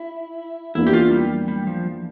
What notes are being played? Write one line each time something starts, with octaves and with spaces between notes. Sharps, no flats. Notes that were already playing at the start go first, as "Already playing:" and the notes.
Already playing: E4
E2 E3 A#3 D4 E4
G4
F4
G3
G3
F3